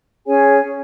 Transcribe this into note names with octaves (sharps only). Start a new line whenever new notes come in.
C#4 G#4 C#5 G#5